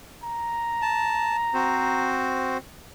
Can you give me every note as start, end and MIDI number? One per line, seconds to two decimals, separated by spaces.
0.24 2.10 82
0.82 1.36 81
1.54 2.57 60
1.54 2.57 66
1.54 2.57 72